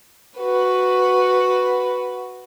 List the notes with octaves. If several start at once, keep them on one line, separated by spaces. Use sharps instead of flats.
F#4 B4